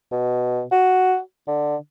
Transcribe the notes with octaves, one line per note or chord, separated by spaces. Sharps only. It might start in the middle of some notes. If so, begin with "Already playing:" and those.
B2
F#4
D3